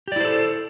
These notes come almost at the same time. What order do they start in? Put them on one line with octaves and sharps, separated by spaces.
G4 D5 E4 C5 A4